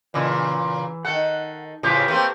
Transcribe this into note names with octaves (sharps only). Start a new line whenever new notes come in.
A#2 C#3 E3
D#3 A4 F#5
A2 C#3 F3 G4 B4
A3 A#3 C4